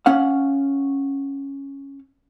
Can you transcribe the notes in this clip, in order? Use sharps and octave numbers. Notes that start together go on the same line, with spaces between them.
C#4 F5 F#5